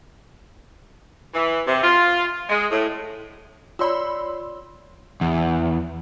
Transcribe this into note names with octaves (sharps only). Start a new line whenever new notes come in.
E3
C3
F4
G#3
A2
F4 C#5 D5 B5 C6 E6
E2